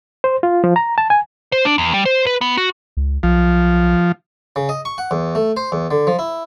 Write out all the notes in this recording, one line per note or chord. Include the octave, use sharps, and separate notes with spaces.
C5
F4
F3
A#5
A5
G#5
C5
D4
E2
G3
C5
B4
B3
F#4
C#2
B1 F3
C#3
D#5
C#6
F#5
E2
A3
C5
E2
D3
F3
E4